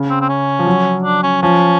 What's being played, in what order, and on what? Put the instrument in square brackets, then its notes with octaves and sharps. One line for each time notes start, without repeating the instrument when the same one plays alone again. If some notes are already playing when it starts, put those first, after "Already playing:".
Already playing: [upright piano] C#3
[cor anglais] C4
C4
C#4
[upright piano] F3
F#3
[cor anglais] D4
C#4
[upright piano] F3 [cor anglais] C#4